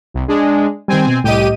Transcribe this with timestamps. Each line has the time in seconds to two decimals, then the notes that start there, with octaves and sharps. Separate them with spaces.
0.14 C2
0.28 G#3 D4 G#4
0.88 D#3 G3 C4 G#5
1.07 B2
1.24 C2 A2 G4 D#5 D#7